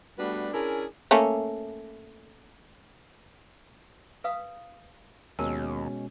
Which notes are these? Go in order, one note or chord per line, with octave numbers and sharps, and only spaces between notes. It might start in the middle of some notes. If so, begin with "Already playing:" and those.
G3 A3 B3 D4 F#4 B4
C#4 D4 E4 G#4 A#4
A3 A#3 C#4
B4 F5 D#6
D#2 B2 G#3 C#4 A#4 A5